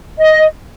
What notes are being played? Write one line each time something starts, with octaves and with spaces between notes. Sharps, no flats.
D#5